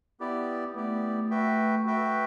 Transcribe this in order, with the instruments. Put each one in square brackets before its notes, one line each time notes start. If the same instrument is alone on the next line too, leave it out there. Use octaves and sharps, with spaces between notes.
[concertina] B3 E4 G4 D5
[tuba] A3 [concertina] B3 E4 G4 D5
[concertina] F#4 B4 E5 G5
F#4 B4 E5 G5